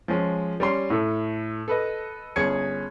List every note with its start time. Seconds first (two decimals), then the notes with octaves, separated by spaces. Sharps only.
0.08 F3 G#3 C#4
0.60 G3 C#4 C6
0.90 A2 A4
1.68 A4 B4 D#5
2.36 G1 C#4 G#4 G#6 C#7